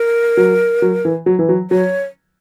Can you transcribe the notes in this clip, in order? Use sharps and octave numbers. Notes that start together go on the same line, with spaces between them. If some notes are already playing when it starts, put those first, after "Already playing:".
Already playing: A#4
F#3
F#3
E3
F#3
E3
F#3
F#3 C#5